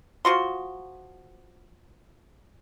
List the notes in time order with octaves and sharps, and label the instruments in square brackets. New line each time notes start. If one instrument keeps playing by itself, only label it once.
[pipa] F3 F#4 C6